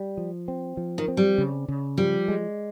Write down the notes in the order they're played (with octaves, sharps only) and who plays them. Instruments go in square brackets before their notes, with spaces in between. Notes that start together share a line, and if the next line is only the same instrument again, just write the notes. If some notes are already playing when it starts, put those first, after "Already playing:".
Already playing: [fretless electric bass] G3
F3
C4
F3
[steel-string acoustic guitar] D#3
[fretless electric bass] C4
[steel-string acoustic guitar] G3
[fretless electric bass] C#3
C#3
[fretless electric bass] F3 [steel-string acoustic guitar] G3
[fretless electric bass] G#3